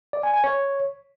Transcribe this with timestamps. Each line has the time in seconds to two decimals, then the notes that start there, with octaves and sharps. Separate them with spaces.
0.13 D5
0.23 G#5
0.34 G#5
0.44 C#5